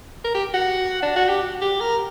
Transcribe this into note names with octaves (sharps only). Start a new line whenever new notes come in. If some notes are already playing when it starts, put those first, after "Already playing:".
A#4
G4
F#4
D4
F#4
G4
G4
A#4